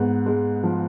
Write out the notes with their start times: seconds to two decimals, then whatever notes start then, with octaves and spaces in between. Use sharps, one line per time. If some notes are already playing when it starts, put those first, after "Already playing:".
Already playing: G#2 B3
0.26 G#3
0.63 F3